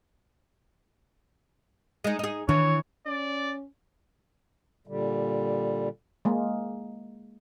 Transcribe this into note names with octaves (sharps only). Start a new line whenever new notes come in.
G#3 D#4
D#4 G#4
D#3 E3 D4 C#5
C#4 D5
A#2 D3 G3
G#3 A#3